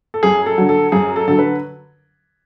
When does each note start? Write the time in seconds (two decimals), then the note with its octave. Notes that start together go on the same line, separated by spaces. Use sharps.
0.14 A4
0.23 F#2 G#4
0.46 A4
0.58 D3 F#3
0.69 A4
0.92 F#2 G#4
1.16 A4
1.28 D3 F#3 A4
1.39 B4